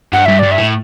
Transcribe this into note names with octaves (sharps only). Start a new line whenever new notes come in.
G2 F#5
G2 E5
G2 D5
E5
A2